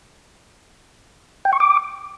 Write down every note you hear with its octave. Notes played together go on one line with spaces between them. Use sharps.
G5
C#6
D6